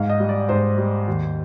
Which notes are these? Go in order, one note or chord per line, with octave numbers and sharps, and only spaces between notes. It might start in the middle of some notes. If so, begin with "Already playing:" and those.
Already playing: G#2 F5
D#5
G3
D5
G#2 C5
G3
D#2